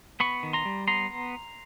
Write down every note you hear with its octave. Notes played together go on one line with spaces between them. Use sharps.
B3 B5 C#6
D#3
A#5 C6
G3
B3 A#5 C6